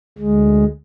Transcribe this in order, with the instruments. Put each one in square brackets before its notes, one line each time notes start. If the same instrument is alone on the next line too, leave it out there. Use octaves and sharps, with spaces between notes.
[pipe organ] D2 G#3